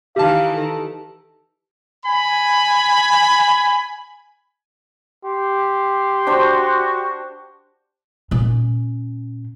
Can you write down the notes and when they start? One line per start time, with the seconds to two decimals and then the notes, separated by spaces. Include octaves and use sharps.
0.16 D#3 E3 G4 F5 A5
0.55 D#3 A4
2.05 G#5 B5
5.25 G4 C6
6.27 D4 F#4 C5 G5 C#6
8.31 A#2 C#4